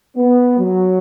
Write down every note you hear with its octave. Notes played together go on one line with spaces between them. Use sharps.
B3
F#3